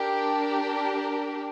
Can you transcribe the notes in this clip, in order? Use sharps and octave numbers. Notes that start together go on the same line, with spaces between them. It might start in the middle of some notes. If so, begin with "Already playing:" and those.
Already playing: D4 G4 A#4